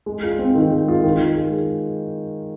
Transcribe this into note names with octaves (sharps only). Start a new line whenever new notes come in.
G#3
F4
C4
D#3
G#3
F4
D#3
F4
G#3